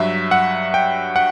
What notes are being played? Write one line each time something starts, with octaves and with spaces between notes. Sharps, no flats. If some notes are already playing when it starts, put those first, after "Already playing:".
Already playing: G2 F#3 E5
F#5
G5
F#5